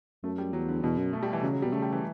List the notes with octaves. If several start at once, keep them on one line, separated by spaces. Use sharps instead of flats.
F#2 A3
G3
E2 F#3
D3
E2 B2
F#2
A3
G3
E3
C#3 F#3
F#3
B2 G3
C#3 A3
G3
E3